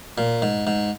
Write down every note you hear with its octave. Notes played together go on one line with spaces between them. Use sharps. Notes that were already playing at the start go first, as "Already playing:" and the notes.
A#2
G#2
G#2